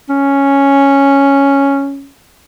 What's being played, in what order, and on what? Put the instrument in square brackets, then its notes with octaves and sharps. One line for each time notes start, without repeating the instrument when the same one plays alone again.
[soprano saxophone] C#4